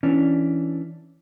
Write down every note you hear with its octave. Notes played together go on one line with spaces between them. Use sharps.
E3 C#4 D4